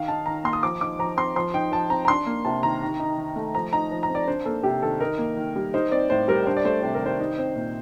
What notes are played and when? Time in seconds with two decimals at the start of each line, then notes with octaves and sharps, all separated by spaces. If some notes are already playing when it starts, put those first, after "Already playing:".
Already playing: D#3 F5
0.08 D#4 A5
0.26 D#3 A#5
0.44 A#3 C6
0.53 D#6
0.63 F3 D6
0.81 D#4 D6
0.99 F3 A#5
1.17 C4 C6
1.36 F3 C6
1.54 D#4 G5
1.72 F3 A5
1.90 C4 A#5
2.05 A#5
2.08 D4 C6
2.26 A#3
2.45 C3 A5
2.63 D#3 A#5
2.82 D#3
3.00 D#4
3.18 D#3
3.36 A3
3.55 F3 A#5
3.73 D#4 A#5
3.91 F3
4.03 A#5
4.09 C4
4.15 D5
4.28 D4 C5
4.45 A#3 A4
4.63 C3 G4
4.82 D#3 A4
5.00 D#4 A#4
5.18 A#3
5.36 D#3
5.56 G3
5.74 D#4 C5
5.91 C4 D5
6.10 A2 C5
6.28 G3 A#4
6.46 D4 C5
6.57 D5
6.65 A3 C5
6.82 C3 C5
6.94 A#4
7.02 D#3 C5
7.20 D#4
7.38 C4
7.56 A#2